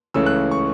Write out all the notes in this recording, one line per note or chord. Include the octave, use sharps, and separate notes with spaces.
C#2 C#3 E3 A3 C#4 E6
F#6
C#6